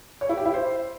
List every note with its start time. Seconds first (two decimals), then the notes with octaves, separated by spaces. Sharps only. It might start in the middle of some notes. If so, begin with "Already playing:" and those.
0.21 C#5
0.29 E4
0.37 G4
0.46 E4
0.54 C5